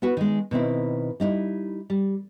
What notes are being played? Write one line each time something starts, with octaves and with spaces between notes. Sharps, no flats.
B3 E4 F#4 B4
D#3 G#3
B2 D#3 C4 E4
G3 D#4 E4
G3